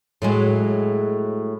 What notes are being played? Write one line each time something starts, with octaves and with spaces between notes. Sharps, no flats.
A2 F#3 G#3